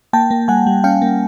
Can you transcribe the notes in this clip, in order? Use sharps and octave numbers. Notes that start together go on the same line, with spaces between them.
A#3 G5 A5
A#3
G3 F#5 G#5
G3
C#4 F5 G5
A#3